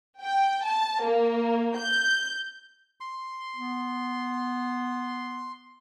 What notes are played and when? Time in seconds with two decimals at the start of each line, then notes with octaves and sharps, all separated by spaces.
0.21 G5
0.65 A5
1.04 A#3
1.76 G6
3.01 C6
3.56 B3